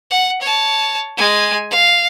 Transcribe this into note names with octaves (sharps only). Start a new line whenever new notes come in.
F#5
C#5 A5
G#3 G#5
F5